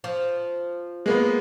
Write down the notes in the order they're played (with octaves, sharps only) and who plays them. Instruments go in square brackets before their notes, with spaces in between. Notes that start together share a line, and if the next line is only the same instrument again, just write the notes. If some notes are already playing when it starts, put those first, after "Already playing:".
[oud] F3
[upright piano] G#3 A#3 B3